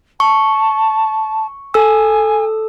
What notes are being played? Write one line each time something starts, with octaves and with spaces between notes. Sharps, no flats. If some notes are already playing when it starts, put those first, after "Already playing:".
A5 C#6
A4 G#5 E6